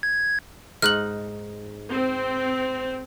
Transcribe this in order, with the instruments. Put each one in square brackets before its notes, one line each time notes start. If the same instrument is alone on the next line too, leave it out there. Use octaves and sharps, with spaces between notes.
[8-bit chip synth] G#6
[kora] G#2 D#4 [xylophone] F6 F#6 F#7
[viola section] C4